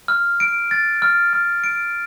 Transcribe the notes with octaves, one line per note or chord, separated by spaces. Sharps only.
F6
D7
A6
F6
F6
D7